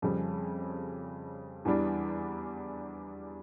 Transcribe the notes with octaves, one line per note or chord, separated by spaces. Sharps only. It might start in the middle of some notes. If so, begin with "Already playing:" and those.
F2 C#3 G3
E2 E3 G3 D4